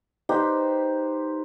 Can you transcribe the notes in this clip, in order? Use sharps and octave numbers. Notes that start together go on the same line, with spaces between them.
D#4 G4 B4 C5